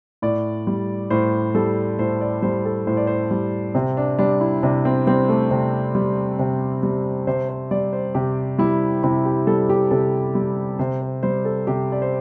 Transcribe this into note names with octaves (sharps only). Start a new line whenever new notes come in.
A2 D5
G3
A2 C5
G3 A4
A2 C5
D5
G3 C5
A4
A2 C5
D5
C5
G3
C3 C4
D4
G3 D4
E4
C3 D4
C4
G3 C4
A3
C3
G3
C3
G3
C3 C5
C5
G3 D5
C5
C3 G4
G3 E4
C3 E4
G4
G3 A4
G4
C3 A4
G3
C3 C5
C5
G3 C5
A4
C3 G4
D5
C5